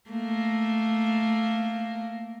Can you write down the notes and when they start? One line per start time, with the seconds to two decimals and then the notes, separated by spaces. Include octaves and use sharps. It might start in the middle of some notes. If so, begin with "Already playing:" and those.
0.10 A3 A#3